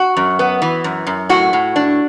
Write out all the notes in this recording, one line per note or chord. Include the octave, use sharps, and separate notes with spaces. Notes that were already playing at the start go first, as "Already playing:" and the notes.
Already playing: F#4
F#2
B3
E3
F#2
F#2
A2 F#4
A2
D4